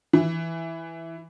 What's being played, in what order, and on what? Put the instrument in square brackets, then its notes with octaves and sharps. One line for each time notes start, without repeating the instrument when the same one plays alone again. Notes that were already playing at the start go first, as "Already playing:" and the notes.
[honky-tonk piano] E3